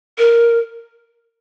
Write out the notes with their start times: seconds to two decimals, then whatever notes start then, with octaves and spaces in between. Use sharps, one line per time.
0.18 A#4